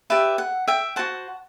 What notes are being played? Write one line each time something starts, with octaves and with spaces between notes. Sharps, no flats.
G4 B4 D5 E5
F#5
E5 G5
F#4 C5 F#5 A5